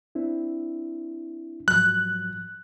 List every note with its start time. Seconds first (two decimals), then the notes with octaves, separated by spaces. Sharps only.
0.15 C4 D4 E4
1.68 G#2 F3 F#3 F#6